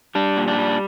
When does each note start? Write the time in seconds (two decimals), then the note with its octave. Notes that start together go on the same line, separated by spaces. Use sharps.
0.15 G3 D4
0.37 A#2
0.47 D4
0.59 G3